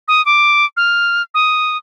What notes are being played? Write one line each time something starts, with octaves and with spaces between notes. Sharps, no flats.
D#6
D6
F6
D#6